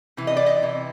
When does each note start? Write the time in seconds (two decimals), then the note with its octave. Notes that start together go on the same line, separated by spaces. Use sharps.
0.17 C3 E3
0.27 D#5
0.37 D5
0.46 D#5
0.62 C3 E3